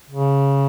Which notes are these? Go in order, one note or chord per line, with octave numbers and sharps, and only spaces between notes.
C#3